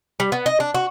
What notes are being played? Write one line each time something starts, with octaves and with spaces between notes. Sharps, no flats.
G3
B3
D#5
D4
F#4